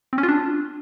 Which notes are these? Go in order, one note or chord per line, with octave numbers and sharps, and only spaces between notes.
C4
C#4
F4
D4